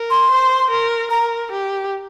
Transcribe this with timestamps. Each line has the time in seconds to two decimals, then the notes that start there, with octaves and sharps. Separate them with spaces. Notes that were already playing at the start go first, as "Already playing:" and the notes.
Already playing: A#4
0.10 C6
0.30 C5
0.70 A#4
1.10 A#4 A#5
1.51 G4